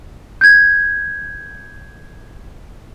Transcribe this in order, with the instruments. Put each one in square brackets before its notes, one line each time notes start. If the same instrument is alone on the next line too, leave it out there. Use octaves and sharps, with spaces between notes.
[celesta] G6 G#6